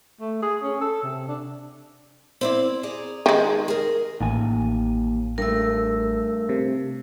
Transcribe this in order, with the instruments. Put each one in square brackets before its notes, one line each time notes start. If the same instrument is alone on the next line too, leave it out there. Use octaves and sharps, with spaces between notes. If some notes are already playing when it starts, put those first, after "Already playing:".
[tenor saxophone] A3
G#4
C#4
A4
C3
D4
[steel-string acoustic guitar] C4 E4 D5
G#4 D5 A#5
[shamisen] D#3 G#3
[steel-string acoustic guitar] G#4 A#4
[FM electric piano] A1 [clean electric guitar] D#2 G#5
[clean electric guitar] G2 A3 [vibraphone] A#4 E6
[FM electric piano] C3